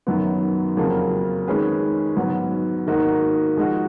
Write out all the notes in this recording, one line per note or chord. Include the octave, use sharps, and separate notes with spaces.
F#2 D#3 F#3 B3
F2 C#3 F#3 A#3 F4
D#3 G#3 C#4 G#4 B4
G#2 F#3 B3
G#2 D#3 A#3 D#4 F#4
F3 G#3 D#4 F#4